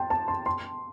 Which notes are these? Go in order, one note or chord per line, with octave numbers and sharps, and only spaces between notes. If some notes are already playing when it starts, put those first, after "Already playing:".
Already playing: G5 A5 C6
A5
C6
C6